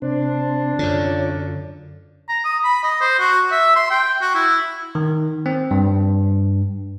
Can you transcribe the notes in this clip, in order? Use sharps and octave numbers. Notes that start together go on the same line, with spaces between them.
C3 C4 D4 C5
F#2 D3 F4 C#5 D5
A#5
D#6
B5
D#5
C5
F#4
E5
C6
G5
F#4
E4
D#3
C4
G2